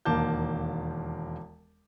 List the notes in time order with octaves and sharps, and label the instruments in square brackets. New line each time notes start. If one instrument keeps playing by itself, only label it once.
[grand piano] E1 D#2 A#3 A5 D6 G6